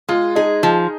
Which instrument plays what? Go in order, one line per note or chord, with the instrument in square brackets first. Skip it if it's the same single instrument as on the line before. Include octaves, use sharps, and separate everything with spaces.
[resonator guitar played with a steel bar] G#3 [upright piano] F4
[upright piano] D#4 [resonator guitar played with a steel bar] G#4
[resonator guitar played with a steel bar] F3